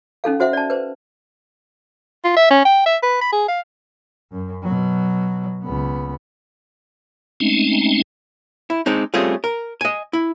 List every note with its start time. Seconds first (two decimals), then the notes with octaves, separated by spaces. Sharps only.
0.24 C#4 D#4 A4 F5
0.40 F#4 C5 E5 F#5
0.53 D5 A5
0.70 B4 C5
2.24 F4
2.36 E5
2.50 C#4
2.65 G5
2.86 E5
3.03 B4
3.21 B5
3.33 G#4
3.48 F5
4.32 F#2
4.63 B2 F#3
5.63 C#2 B3
7.40 G#3 A3 C4 C#4 D#4
8.70 E4
8.86 G#3 C4 D4 D#4
9.14 G3 A3 C4 C#4 F4 G#4
9.44 A#4
9.81 D#5 G#5
10.13 E4